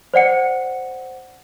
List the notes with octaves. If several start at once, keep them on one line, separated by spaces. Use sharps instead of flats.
C5 D5 F#5 C#7